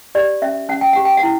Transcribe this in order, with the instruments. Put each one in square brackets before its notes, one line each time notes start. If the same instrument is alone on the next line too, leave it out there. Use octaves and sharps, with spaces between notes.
[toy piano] G4 D5
C#4 E5
C#4 F#5
G5
G4 F#5
G5
F#5
E4